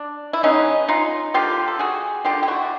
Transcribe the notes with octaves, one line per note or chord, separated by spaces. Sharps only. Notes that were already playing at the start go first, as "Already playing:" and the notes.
Already playing: D4
E4
E3 G#3 B3 C#4 D#4
D#4 F4
D3 G3 A#3 F4 G4
A4
F#4 G#4
D3 G3 A#3 F4 G4
G4
E4 F#4